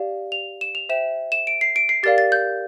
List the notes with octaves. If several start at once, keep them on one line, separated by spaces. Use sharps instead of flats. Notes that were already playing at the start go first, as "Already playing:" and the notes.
Already playing: G4 D5 F5
F7
E7
F7
C5 E5 G5 E7
E7
D7
C7
D7
C7
G4 A#4 D5 F5 A6
A6
G6